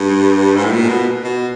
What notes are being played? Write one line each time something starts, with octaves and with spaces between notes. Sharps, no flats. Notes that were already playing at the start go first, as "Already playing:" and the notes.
Already playing: G2
G#2
A2
A#2
B2
B2